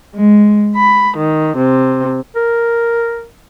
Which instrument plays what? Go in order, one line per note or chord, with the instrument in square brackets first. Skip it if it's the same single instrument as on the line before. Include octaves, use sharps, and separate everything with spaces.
[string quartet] G#3
B5
D#3
C3
[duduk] A#4